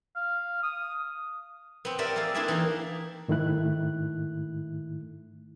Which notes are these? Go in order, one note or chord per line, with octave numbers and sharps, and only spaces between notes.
F5
D#6
B3 C4
G4 A#4 D5 E5
A#3 G#4 A4 F5
C4 D4 E4 G#4 D5 E5
E3 D#4 G4 A#4
G#2 D#3 A3 E4 F#6